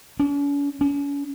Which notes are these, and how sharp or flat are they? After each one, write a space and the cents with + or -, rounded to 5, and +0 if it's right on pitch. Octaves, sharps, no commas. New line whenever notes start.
C#4 +45
C#4 +40